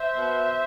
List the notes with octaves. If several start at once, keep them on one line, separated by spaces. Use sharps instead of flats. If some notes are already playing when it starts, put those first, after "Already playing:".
Already playing: C5 E5
B2